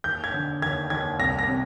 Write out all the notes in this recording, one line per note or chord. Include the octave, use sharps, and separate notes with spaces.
D#2 G6
G#6
D3
D#2 G#6
D#2 G#6
C2 A#6
A#6
C3